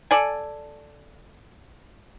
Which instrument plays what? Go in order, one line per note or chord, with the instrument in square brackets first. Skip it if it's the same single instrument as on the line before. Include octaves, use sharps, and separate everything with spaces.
[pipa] A4 D5 G#5